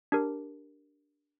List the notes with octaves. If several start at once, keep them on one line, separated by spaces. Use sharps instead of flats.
D4 G4 A#4